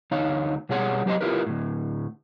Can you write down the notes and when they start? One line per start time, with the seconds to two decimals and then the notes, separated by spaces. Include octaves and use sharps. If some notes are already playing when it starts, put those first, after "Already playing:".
0.11 D2 D#4 C#5 F5
0.69 B2 G3 G#4 C#5 F#5 C6
1.06 F#3 G4 C5 D#5 C6
1.21 E4 F4 G4 A#4 B4
1.47 D2 A2